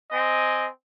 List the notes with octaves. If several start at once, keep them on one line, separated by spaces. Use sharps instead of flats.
C4 D#5 G#5